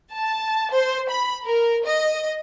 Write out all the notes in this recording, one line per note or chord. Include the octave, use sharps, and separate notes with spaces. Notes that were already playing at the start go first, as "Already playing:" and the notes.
A5
C5
B5
A#4
D#5